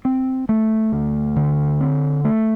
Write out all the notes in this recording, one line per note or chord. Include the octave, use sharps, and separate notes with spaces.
C4
A3
D2
D3
C4
A3